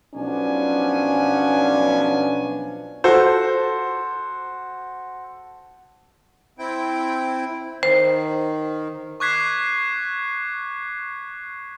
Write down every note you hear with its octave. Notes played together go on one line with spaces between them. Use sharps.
B1 F3 B3 C#4 D4 G#5
F#4 A4 C5
C4 E4 G5
D#3 C5
C#6 D6 F#6 G#6 B6 C7